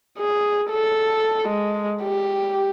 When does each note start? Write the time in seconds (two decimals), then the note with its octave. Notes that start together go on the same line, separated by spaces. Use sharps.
0.18 G#4
0.70 A4
1.48 G#3
2.03 G4